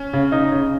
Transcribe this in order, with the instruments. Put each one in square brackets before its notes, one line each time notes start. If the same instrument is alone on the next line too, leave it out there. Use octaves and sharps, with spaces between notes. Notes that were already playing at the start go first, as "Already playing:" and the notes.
Already playing: [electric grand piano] C#4
[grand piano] C#3
D#4
C#3